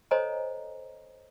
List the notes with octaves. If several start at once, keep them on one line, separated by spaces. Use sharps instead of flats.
A4 C5 C#5 D#5 G#5 A#5